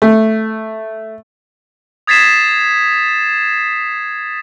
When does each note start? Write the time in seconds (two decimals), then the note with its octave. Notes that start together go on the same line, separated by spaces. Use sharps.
0.02 A3
2.07 D#6 G#6 A6 B6 C7 E7